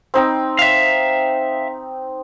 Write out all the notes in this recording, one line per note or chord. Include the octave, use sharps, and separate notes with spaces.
C4 D#4 G5
E5 F5